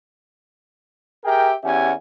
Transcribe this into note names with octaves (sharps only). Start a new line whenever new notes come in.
G4 G#4 A#4 E5 G5
E2 C#4 G4 E5 F#5 G#5